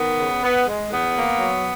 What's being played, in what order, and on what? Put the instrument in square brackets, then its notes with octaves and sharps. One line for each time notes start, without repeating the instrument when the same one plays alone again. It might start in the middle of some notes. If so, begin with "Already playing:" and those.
Already playing: [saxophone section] D#3 B3
C#3
B3
G#3
E2 B3
A#3
F#3